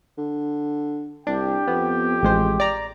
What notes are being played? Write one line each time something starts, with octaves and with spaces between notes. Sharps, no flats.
D3
C2 D4 G4 G5
F2 B3
A1 G#3 C5
D5 A#5